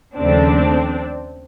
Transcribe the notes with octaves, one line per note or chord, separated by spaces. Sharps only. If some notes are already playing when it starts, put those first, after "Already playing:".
D#2 C#3 F3 A3 C4 D4